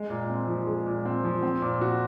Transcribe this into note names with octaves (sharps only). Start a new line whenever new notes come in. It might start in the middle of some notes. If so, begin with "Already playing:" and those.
Already playing: G#3
A#2
C4
F3
G#3
A#2
C4
F3
C4
A#2
F#4